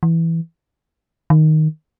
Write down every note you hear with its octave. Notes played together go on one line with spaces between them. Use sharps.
E3
D#3